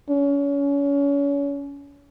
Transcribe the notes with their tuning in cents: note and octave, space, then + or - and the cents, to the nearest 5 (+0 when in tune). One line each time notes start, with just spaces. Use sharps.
C#4 +30